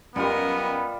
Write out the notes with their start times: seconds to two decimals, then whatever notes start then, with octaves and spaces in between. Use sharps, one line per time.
0.16 F#2 G3 B3 F4 G4 A#4 D#5